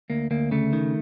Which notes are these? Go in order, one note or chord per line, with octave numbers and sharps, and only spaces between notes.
D2 A#3
D2 A#3
C#3 A3
D#3